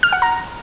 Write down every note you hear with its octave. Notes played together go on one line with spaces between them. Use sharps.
F6
F#5
A#5